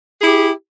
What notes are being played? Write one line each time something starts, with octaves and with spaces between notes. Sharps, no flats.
E4 G4 G#4